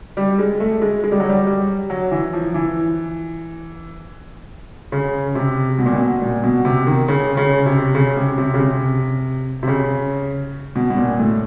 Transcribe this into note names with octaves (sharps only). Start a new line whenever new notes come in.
G3
G#3
A3
G#3
G#3
G3
F#3
G3
G3
F#3
E3
F3
E3
C#3
C3
B2
A#2
B2
A#2
B2
C3
D#3
C#3
C#3
C3
C#3
C3
C3
C#3
C3
C3
C#3
B2
B2
A#2
A2